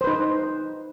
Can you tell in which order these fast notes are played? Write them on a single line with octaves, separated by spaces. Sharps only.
C5 B4 D#4